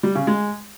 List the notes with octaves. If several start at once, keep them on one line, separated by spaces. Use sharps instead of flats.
G3
C#3
G#3